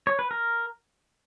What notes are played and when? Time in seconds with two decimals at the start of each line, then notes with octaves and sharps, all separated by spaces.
0.07 C#5
0.19 B4
0.31 A#4